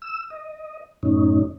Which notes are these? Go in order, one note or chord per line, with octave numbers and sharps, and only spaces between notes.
E6
D#5
F#2 A2 C#4 D#4